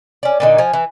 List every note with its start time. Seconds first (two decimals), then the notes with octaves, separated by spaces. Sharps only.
0.23 C#4 D5
0.40 A#2 D3 D#4
0.58 F3 G#5
0.73 E3